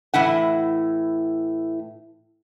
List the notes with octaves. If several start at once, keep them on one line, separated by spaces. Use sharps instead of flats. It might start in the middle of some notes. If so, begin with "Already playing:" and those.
A2 E3 E4 F#5